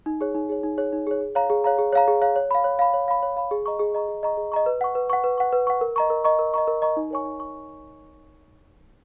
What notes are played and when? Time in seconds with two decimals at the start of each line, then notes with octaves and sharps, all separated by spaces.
0.06 D#4
0.21 G#4 C#5
0.35 D#4
0.49 G#4 C#5
0.63 D#4
0.78 G#4 C#5
0.93 D#4
1.07 G#4 C#5
1.21 G#4
1.35 C#5 F5 A#5
1.50 G#4
1.64 C#5 F5 A#5
1.78 G#4
1.93 C#5 F5 A#5
2.08 G#4
2.21 C#5 F5 A#5
2.36 C#5
2.51 F5 B5
2.64 C#5
2.79 F5 B5
2.94 C#5
3.08 F5 B5
3.23 C#5
3.37 F5 B5
3.51 G#4
3.66 D#5 A#5 C#6
3.79 G#4
3.94 D#5 A#5 C#6
4.08 G#4
4.23 D#5 A#5 C#6
4.37 G#4
4.52 D#5 A#5 C#6
4.66 B4
4.81 F#5 C#6
4.95 B4
5.10 F#5 C#6
5.24 B4
5.38 F#5 C#6
5.53 B4
5.67 F#5 C#6
5.81 A#4
5.96 D#5 A#5 C#6
6.10 A#4
6.24 D#5 A#5 C#6
6.39 A#4
6.54 D#5 A#5 C#6
6.67 A#4
6.82 D#5 A#5 C#6
6.97 D#4
7.11 A#4 C#5 G#5 C#6
7.25 D#4
7.40 C#6